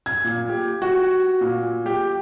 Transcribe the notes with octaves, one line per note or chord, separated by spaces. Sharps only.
G#6
A#2
G4
F#4
A#2
G4